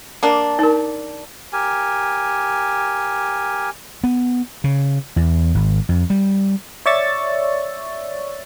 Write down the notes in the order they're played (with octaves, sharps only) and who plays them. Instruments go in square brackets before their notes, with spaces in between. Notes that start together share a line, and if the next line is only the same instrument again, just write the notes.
[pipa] A#3 D4
[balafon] D#4 A#4
[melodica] G4 A#4 G#5
[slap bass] B3
C#3
E2
G#1
F2
G3
[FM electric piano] C#5 D5 E5 C#6 E6 A6